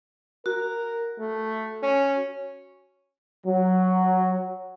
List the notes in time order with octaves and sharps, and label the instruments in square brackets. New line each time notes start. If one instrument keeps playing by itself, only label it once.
[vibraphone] F#4 [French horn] A#4
[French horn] A3
C#4
[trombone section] F#3